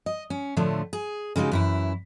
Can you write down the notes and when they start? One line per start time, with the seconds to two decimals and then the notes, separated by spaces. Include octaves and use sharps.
0.06 D#5
0.30 C#4
0.57 A2 D3 F3 A3 D4
0.93 G#4
1.36 C#3 G#3 D#4 F#4 G4
1.52 F#2 E3 E4